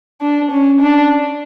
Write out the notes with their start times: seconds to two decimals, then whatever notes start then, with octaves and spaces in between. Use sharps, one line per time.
0.21 D4
0.51 C#4
0.81 D4